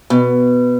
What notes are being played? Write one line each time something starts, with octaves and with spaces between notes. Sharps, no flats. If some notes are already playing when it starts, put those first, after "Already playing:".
B2